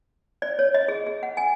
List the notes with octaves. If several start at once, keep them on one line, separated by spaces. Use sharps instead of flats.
D5
C#5
D#5
G#4
G#4
F#5
G#5